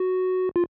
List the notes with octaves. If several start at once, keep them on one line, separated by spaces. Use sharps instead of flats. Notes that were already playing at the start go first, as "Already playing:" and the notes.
Already playing: F#4
F4